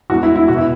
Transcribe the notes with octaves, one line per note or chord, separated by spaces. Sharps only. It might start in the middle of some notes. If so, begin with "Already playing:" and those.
E2 E3 G#3 F#4
E4
E4
B2 B3 F#4
E4